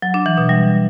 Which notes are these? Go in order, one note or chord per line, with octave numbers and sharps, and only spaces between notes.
F#3
D4
E3
B2
G3